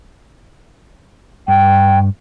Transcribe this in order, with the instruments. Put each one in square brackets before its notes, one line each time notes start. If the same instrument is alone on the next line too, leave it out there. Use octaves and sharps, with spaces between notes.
[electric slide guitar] G2 [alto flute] G5